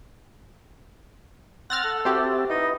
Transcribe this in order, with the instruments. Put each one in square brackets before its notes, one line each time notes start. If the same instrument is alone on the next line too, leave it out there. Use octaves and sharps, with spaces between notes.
[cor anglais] C4 [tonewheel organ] F#5 F#6 [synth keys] F6 A6 A#6
[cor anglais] A4
[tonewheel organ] C4 E5 A5 [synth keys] F#4 G4 C5
[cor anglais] D#4 [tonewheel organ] E4 B4 D#5